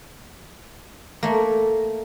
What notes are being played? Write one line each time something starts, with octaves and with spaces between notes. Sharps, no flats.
A3 A#3